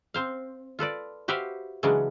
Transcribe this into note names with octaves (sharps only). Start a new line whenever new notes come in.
C4 C5 F5
F4 A4 B4 D5
F#4 G4 B4 C5 E5 F5
C#3 E3 F#3 G#3 C#4 D4